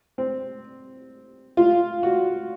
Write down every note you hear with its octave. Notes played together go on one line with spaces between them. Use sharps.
C4
F4
F#4